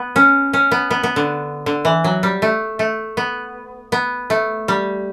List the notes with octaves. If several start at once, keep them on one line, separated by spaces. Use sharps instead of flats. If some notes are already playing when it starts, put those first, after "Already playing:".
Already playing: B3
C#4
C#4
B3
B3
B3
D3
D3
E3
F#3
G3
A3
A3
B3
B3
A3
G3